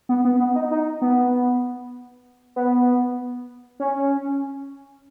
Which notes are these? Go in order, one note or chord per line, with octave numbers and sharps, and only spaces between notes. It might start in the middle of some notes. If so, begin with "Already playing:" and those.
B3
B3
B3
D#4
D#4
B3
B3
C#4